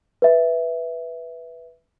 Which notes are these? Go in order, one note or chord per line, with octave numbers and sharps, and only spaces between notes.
B4 E5